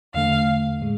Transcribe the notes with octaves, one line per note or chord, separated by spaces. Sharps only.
E2 D3 A3 F5
A2 G#3